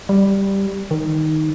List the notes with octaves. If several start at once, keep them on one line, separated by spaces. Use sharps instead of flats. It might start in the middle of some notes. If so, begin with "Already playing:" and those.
G3
D#3